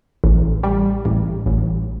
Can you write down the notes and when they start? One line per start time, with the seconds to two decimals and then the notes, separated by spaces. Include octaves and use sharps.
0.24 A1
0.63 G3
1.05 A1
1.46 A1